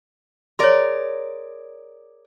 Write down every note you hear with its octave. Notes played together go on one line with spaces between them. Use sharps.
G#4 A#4 C#5 D5 C6